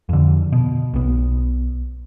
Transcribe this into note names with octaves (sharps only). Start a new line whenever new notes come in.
F2 D3
B2
B1 B3